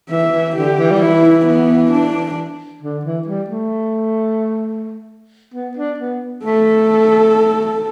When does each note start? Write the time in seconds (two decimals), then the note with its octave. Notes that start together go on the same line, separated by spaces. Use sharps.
0.11 E3 E5
0.34 E3
0.56 D3 G4
0.79 E3
0.91 G3
1.01 E3 E4
1.47 B3
1.92 D4
2.83 D3
3.05 E3
3.28 G3
3.50 A3
5.54 B3
5.77 D4
6.00 B3
6.45 A3 A4